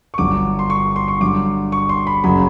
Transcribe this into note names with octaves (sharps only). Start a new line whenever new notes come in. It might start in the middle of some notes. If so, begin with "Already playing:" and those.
C#6
G1 G2 D3 F#3 D6
C6
C#6
C6
C#6
G2 D3 F#3 D6
C#6
C6
B5
F#1 F#2 C#3 F#3 B5